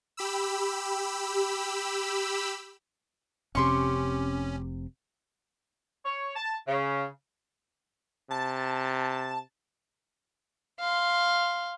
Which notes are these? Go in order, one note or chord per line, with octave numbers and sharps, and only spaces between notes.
G4 B5 E6
F1 C3 C#4 G4 C6 C#6
C#5
A5
C#3
C3 A5
F5 C6